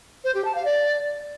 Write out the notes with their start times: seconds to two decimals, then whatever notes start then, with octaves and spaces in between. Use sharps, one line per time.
0.24 C5
0.35 G4
0.45 A5
0.55 F5
0.65 D5